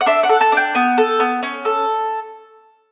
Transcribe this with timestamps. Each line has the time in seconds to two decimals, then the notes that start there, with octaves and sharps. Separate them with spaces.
0.01 F#5
0.06 D4 E5
0.23 F#5
0.29 A4
0.41 A5
0.52 D4 G5
0.75 B3
0.98 A4
1.20 B3
1.43 C#4
1.65 A4